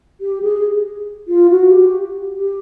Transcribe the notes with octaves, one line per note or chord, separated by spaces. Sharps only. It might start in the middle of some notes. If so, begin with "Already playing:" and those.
G4
G#4
F4
F#4
G4
G4